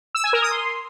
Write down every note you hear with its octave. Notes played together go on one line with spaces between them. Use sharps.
E6
G#5
A#4
D#6
C6